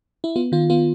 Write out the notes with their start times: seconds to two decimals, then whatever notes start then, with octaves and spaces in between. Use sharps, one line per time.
0.24 E4
0.36 B3 F4
0.52 D#3 F4
0.70 B3 F4